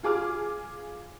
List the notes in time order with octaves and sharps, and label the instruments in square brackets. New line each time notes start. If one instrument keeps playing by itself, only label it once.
[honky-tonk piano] F4 G#4 D6 F6